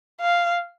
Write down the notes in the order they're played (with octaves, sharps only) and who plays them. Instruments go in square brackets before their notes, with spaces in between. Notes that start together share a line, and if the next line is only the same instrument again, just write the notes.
[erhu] F5